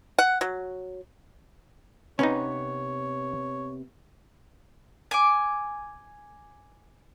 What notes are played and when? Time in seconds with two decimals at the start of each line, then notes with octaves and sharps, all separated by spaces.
0.18 F#5
0.41 F#3
2.19 C3 B3 C#4 D#4 B4 C#5
5.11 G#5 D6